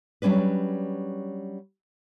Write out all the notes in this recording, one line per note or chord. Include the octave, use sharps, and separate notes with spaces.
F#3 G3 C#4 D4 B4